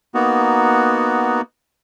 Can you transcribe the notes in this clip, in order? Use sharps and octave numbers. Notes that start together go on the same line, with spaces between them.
A#3 B3 D#4 F#4